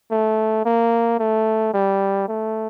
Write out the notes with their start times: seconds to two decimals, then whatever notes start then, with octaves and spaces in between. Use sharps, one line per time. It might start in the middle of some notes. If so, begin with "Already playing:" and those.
0.11 A3
0.65 A#3
1.19 A3
1.74 G3
2.28 A3